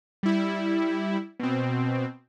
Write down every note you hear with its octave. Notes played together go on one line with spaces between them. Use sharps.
G3 E4
B2 C4